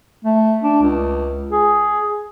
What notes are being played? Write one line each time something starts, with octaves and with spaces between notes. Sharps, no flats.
A3
D4
C#2
G#4